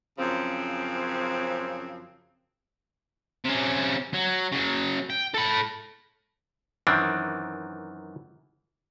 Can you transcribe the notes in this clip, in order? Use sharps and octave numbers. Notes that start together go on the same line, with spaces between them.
F#2 C#3 F3 C4
C3 C#4
F#3
C#3 F#3
G5
A4 B5
F#2 D#3 E3 C4 D4